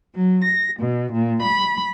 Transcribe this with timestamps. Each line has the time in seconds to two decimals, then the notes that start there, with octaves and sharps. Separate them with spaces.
0.16 F#3
0.44 A#6
0.80 B2
1.13 A#2
1.43 B5